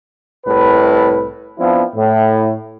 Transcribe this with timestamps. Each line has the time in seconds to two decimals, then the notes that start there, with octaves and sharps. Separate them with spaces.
0.46 C2 A2 B4
1.59 F3 B3 C4 D4 E4
1.96 A2